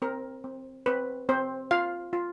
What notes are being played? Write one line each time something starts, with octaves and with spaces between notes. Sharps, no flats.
C4 A#4
C4
C4 B4
C4 C5
F4 F5
F4